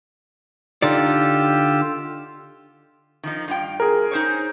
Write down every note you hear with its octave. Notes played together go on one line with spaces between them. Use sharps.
D3 D#4 F4 G4 D5 E6
D#3 F3 D#4
G2 F4 G5
G#4 A#4
D#4 C5 C#5